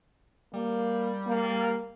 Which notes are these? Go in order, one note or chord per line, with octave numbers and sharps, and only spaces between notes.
G3 A#3
A#3